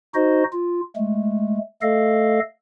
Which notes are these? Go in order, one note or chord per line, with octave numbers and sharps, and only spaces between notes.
D#4 F#4 C5 D#5
F4
G#3 A3
A3 A4 D#5 F5